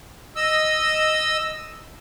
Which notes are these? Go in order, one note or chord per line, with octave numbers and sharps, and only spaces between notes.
D#5 E6